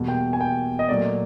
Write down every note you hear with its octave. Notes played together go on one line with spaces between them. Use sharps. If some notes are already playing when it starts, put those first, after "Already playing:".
Already playing: E2 B2 G3 A#3
G5
G#5
G5
D#5
A#2 F#3 A3 D5